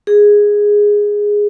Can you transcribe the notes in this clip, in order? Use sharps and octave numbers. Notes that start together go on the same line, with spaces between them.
G#4